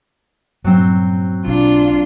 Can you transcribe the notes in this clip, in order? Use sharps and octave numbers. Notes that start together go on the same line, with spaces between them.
G2 A#2 F#3 C4
B1 D4 F4